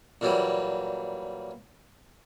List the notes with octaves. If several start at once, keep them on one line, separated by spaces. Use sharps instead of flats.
A#2 E3 F#3 G3